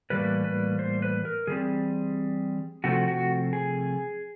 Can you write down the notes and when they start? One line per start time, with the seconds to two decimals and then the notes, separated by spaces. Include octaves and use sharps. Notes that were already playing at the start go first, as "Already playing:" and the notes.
0.10 A2 E3 G3 A#3 B4
0.44 B4
0.79 C5
1.02 B4
1.25 A#4
1.47 E3 G3 C4 G#4
2.84 C3 F3 A3 C4 F#4
3.08 F#4
3.53 G#4